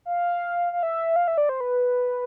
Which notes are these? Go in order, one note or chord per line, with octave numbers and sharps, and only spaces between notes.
F5
F5
E5
F5
E5
D5
C5
B4